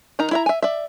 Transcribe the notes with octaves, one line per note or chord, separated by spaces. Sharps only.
D#3 D#4 A#5
E4 E5 A#5
E5 G#5
D5 E5